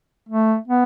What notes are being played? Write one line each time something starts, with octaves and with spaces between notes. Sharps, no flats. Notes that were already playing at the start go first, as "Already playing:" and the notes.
A3
B3